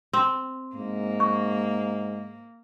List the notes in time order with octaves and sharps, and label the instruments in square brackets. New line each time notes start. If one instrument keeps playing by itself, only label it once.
[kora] C4
[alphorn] G#2 [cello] A#3
[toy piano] C#6